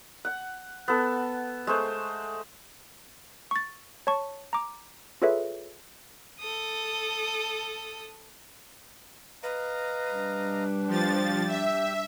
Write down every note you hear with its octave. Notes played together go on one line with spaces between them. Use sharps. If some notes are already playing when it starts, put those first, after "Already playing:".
F#5
B3 A4
G#3 A3 C5
C#6 A6
C#5 A5 C#6
A#5 D6
F4 G#4 A4 B4 C#5 E5
A4 D#6
B4 D#5 F5 A#5
G3 D4
F3 G4 A6
E5